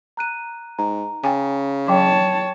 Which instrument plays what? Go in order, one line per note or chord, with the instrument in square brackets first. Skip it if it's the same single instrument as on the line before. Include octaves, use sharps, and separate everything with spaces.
[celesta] A#5 F#6 D#7
[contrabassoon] G#2 [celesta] A#5
[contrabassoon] C#3 [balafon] G5 G#5
[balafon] F#3 [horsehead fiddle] C#5 A5 [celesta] G5 C6